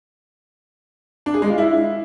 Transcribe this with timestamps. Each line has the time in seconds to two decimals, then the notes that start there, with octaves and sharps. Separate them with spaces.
1.26 D4
1.34 G#4
1.42 G#3
1.50 F4
1.58 E4